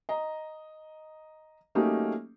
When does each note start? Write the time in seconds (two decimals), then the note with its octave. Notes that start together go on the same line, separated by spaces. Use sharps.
0.09 D#5 A#5
1.75 F#3 A3 A#3 C#4 D#4 G4